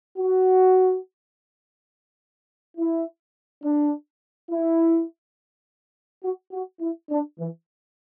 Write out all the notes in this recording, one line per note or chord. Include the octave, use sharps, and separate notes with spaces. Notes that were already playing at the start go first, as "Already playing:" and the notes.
F#4
E4
D4
E4
F#4
F#4
E4
D4
E3